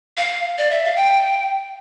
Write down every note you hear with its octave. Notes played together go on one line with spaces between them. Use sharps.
F5
D5
E5
F5
G5